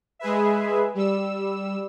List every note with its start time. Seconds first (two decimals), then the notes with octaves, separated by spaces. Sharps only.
0.19 G#3 G#4 B4 E5
0.94 G3 E6